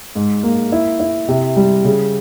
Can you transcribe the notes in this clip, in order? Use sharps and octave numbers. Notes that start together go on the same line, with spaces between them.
G#2
A#3
E4
E4
C3
G3
C#3